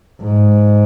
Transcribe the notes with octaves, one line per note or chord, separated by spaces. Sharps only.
G#2